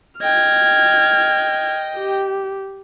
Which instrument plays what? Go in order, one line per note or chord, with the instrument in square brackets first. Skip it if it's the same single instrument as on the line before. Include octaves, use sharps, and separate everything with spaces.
[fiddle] D#5 G5 [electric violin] F6 G#6
[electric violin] G4